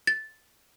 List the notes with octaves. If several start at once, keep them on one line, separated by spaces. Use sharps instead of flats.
A6